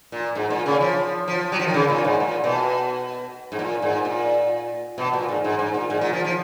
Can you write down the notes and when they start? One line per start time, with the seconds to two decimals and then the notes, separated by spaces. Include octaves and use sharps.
0.12 A#2
0.35 G#2
0.50 A#2
0.66 C#3
0.81 F3
1.28 F3
1.52 F#3
1.59 F3
1.66 D#3
1.74 C#3
1.90 A#2
2.04 G#2
2.20 A#2
2.44 B2
3.52 G#2
3.59 A#2
3.82 G#2
4.05 A#2
4.98 B2
5.13 A#2
5.28 G#2
5.44 G#2
5.59 G#2
5.74 A#2
5.90 G#2
6.01 A#2
6.13 F3
6.24 F3